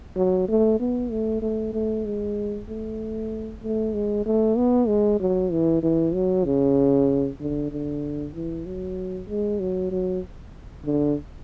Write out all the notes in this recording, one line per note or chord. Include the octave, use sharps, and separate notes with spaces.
F#3
A3
B3
A3
A3
A3
G#3
A3
A3
G#3
A3
B3
G#3
F#3
E3
E3
F#3
C#3
D3
D3
E3
F#3
G#3
F#3
F#3
D3